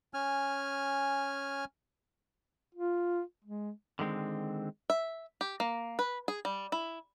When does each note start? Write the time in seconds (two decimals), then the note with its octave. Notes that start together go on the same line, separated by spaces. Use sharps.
0.14 C#4 G#5 F6
2.75 F4
3.44 G#3
3.99 D3 D#3 G#3 C4
4.90 E5
5.41 G4
5.60 A#3
5.99 B4
6.28 G#4
6.45 G3
6.72 E4